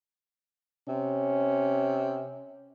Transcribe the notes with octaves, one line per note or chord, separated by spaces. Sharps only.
C3 C#4